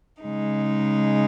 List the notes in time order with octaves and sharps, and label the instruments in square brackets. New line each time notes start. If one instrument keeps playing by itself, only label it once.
[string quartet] C#3 G#3 D#4